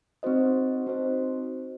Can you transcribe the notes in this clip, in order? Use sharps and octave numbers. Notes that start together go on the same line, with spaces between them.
C4 D#4 F#4 C5 D#5
C4 D#4 F#4 C5 D#5